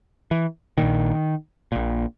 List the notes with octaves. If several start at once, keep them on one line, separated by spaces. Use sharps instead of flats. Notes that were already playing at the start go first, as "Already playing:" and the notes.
E3
A#1 A#2 D#3
A#1 A#2